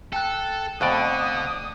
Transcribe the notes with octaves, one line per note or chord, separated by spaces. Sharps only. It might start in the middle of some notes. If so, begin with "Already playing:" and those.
A4 G5 A5 F#6
F2 B2 D3 A3 D5 D#6 F#6